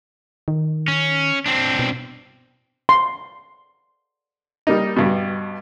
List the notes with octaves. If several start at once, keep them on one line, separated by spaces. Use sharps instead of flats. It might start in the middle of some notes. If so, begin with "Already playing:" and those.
D#3
C#4
C4 D4
B2
C6
G3 A#3 D#4
G2 B2